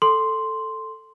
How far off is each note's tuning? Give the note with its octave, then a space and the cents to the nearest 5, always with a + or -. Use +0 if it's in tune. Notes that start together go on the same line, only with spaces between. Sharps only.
A4 +5 C6 +0